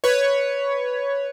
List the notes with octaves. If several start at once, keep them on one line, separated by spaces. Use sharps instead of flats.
B4 C#5